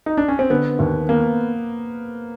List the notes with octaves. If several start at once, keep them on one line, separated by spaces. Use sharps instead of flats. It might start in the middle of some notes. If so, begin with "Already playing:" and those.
D#4
D4
C#4
C4
D3 B3
D#2
A#3 B3